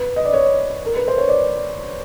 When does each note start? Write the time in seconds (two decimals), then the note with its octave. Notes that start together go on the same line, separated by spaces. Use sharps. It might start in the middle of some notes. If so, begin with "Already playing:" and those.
Already playing: B4
0.16 D#5
0.25 D5
0.34 C#5
0.86 A#4
0.97 B4
1.08 C5
1.18 C#5
1.29 D5